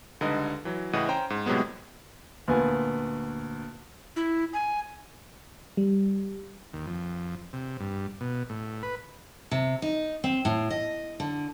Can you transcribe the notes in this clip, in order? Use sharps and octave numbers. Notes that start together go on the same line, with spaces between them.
C#2 D3 G3 D#4 B4 D#5
E3 F#3
A2 C#3 E3 D#5 F#5 D#7
C#4 C5 G5 A#5
G#2
A2 C3 F#3 G#3 B3
D2 A#2 B3 F4 B4 G#5
E4
G#5
G3
D#2
F2
C3
G2
B2
A2
B4
C3
D#4
C4
A2
D#5
D3